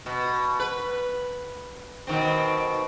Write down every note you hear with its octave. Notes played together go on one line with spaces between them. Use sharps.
B2
B4
B2 D#3 C4